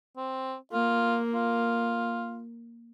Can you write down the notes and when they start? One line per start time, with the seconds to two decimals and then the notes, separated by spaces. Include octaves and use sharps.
0.17 C4
0.73 A#3 F4
1.34 F4